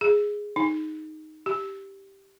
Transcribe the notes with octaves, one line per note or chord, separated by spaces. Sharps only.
G#4
D#4
G4